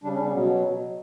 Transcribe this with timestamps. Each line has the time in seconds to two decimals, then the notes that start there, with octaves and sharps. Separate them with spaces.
0.04 C#3 G3 D4
0.14 C#4
0.23 B3
0.34 B2 F#3 B3